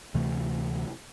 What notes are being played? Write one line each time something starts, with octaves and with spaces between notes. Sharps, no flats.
D2 C3 E3 A3